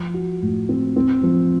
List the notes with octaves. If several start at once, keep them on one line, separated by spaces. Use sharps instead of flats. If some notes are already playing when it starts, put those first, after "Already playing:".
Already playing: F3
F#4
A2
C4
C4
F3